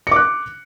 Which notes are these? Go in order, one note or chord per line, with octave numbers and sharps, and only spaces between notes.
D6 F#6 C#7